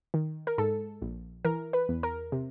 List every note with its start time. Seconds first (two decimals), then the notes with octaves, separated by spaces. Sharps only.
0.14 D#3
0.47 A#4
0.58 G#2 A4
1.02 A#1
1.45 E3 A#4
1.73 B4
1.89 E2
2.03 A#4
2.32 C3